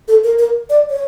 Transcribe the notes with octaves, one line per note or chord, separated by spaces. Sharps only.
A4
A#4
A#4
D5
C#5